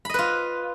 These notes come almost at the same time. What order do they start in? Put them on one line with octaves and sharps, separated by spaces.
B5 D#5 B4 F4